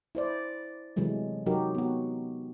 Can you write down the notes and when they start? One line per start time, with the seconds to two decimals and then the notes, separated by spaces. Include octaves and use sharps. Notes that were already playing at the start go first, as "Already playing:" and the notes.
0.15 E4 C5 D5
0.96 C3 E3 F#3 G#3 A3
1.46 C3 F#3 D#4 F#4 G4 A#4
1.75 B3 F#4